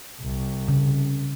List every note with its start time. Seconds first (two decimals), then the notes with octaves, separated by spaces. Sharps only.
0.22 C2
0.68 C#3